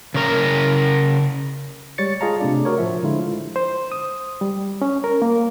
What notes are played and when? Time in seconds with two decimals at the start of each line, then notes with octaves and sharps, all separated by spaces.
0.14 C#3 A#4
1.98 G3 G#3 C#5 A6 C#7
2.21 F4 G#4 D#5 F5 A5 A#5
2.40 C3 A3 D4 D5
2.65 F#4 A#4 C#5
2.78 A2 F3 E5
3.03 D3 F3 G#3 E4 F4
3.56 C5
3.92 D#6
4.41 G3
4.82 C#4
5.04 A#4
5.22 A#3